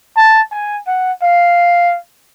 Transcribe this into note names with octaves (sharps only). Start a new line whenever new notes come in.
A5
G#5
F#5
F5